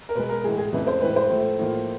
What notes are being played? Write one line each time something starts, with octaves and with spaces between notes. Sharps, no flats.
A#4
B2 G#3 B4
A#4
A2 E3 G#3 G#4
G#4
F2 C#3 E3 A3 B4
C5
A2 E3 G#3 B4
C5
A2 F3 A3
A2 F3 A#3